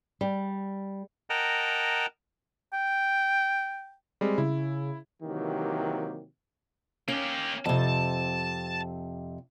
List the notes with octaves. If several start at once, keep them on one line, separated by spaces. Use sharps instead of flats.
G3
A#4 D#5 F#5 G5 A5 A#5
G5
G3 G#3 C4
C#3 E4
C3 D#3 E3 F#3 A#3 G4
A#3 C#4 G4
F2 C3 A5